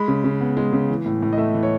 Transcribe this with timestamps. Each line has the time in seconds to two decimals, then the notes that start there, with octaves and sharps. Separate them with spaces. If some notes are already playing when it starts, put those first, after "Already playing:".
Already playing: G#3 B5
0.08 C#3
0.24 C#3
0.41 B3
0.57 G#3
0.73 C#3
0.89 E3
1.06 A2
1.22 A2
1.33 D#5
1.38 A3 E5
1.54 E3
1.63 C#5